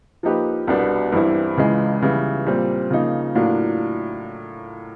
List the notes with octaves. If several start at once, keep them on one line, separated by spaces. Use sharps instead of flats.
F3 A#3 D#4 G4 B4
C2 B2 G3 B3 D4
G2 E3 G3 C4 E4
C#2 C#3 E3 G#3
C#3 E3 G3 B3 E4
A#2 G3 C4
C#3 F3 A#3 D#4
A2 F#3 A#3 D4 F4